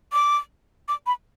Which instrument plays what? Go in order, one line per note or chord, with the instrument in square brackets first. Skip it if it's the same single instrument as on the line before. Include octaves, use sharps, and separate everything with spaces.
[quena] D6
D6
B5